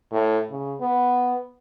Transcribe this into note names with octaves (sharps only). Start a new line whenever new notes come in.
A2
C#3
B3